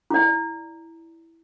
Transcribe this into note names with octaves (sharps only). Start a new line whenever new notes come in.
E4 D5